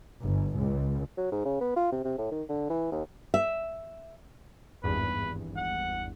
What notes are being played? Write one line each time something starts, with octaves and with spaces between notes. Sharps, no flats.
G1
C#2
F#3
G#2
C#3
B3
F4
C3
C3
A2
D#3
D3
E3
D#2
E5
G#1 E2 G2 B4
F#5